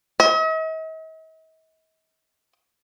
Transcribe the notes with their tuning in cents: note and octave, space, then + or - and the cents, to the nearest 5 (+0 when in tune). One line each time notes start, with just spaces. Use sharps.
D#5 +45